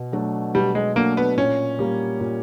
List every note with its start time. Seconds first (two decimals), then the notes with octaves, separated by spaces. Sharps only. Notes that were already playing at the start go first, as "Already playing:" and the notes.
Already playing: B2
0.12 F#3 A3 D4
0.55 B2 G3
0.75 G#3
0.96 F#3 A3 A#3 D4
1.17 B3
1.37 A#2 C#4
1.79 G3 A#3
2.20 A#2